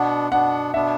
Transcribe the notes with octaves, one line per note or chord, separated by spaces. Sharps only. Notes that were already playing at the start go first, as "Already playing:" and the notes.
Already playing: B2 B3 D4 F#5
B2 B3 D4 F#5
B2 B3 D4 E5